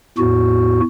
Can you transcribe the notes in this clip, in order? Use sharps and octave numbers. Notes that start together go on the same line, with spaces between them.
E2 A2 F#4